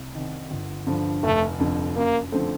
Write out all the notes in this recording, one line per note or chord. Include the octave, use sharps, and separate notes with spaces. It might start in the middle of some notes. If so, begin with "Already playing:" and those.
Already playing: C2
C3 D#3
G1
G2 D3 F3
F1 A3
F2 D3
F#2 A#3
D3 F3 A3 C4